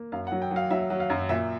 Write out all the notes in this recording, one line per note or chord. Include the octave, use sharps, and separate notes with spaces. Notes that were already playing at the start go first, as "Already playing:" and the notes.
Already playing: A#3
F#2 F5
F#5
F#3
G5
F#3
F5
F#3 E5
F#3
F5
F#2
A#2 E5